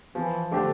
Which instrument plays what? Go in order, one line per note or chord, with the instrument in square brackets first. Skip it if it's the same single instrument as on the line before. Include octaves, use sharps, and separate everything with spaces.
[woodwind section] E3 [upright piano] F3
[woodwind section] D3 [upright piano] A3 D4 G4 C5